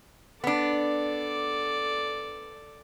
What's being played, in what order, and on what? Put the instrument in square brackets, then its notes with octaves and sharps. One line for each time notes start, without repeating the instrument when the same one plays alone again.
[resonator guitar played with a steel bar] B3 D4 [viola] A4 D5